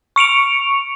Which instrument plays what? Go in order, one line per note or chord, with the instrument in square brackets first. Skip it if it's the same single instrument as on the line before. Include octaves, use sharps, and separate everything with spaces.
[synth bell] C#6 C#7 D7 F7